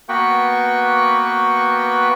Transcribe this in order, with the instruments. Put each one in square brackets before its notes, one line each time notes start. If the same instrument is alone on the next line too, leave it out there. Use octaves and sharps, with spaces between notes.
[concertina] A#3 B3 F#4 B4 G5 C#6